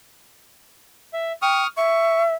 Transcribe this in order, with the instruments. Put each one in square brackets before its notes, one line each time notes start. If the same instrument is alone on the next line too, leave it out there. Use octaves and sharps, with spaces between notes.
[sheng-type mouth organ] E5
[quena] G5 [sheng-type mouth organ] C#6 D#6 F6
[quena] E5 [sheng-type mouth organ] C#6